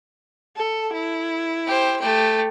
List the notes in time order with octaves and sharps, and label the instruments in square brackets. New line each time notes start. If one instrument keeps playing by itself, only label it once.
[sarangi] A4
E4
[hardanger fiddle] G4 C5
A3 G4